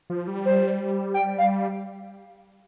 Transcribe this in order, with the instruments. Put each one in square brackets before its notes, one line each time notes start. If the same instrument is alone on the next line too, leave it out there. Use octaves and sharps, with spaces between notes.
[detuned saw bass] F3
G3
[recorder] C5
G5
F5